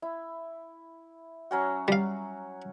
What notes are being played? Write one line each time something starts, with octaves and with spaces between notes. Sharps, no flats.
E4
F#3 C#4 F#4
G3 F5